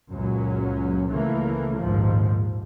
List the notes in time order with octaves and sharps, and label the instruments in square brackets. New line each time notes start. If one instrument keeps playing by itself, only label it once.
[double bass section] C#2 F#2 A#2 F#3 C#4
C#2 C#3 E3 A3 A#3
A#1 D#2 G#2 F3